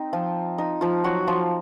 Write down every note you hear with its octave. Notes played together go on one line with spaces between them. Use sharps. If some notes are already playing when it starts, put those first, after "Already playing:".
Already playing: C4 D#4
F3 F4
D#4
F3 F4
F#3 F#4
F3 F4